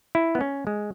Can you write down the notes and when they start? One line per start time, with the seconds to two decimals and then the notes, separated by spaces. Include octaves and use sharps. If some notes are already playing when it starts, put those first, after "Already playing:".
0.15 E4
0.35 B3
0.41 C#4
0.67 G#3